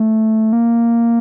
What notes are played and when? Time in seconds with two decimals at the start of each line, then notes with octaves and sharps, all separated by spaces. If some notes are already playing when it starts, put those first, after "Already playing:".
Already playing: A3
0.53 A#3